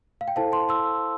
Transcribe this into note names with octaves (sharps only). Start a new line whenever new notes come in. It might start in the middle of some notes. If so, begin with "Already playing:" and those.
F5
G5
E4 A4 C5 F5 A5
A5 C6
C6 E6